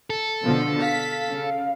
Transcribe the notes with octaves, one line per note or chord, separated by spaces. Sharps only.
A4
B2 D3 F3
F5 B6
C#3